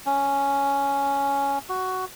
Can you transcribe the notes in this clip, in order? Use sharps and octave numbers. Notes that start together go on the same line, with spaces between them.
C#4
F#4